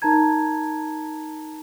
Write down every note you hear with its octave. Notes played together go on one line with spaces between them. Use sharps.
D#4 A#4 A5 A#5 G#6